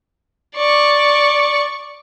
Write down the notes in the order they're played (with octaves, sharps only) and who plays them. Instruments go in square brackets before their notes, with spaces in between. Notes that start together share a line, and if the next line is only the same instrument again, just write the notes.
[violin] D5 C#6